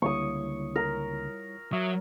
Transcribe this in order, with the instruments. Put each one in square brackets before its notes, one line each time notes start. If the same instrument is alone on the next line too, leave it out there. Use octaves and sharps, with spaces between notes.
[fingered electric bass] C#2 D3 A#3 [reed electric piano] G3 E4 C#5 [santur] C#6 D#6
[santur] A#4
[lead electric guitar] F#3 [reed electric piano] E5 C#6 D#6